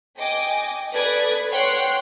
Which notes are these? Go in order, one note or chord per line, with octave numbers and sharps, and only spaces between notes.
D#5 G5 G#5 D6 D#6
A4 B4 D5 D#6 G#6
C#5 F#5 G5 C6 F#6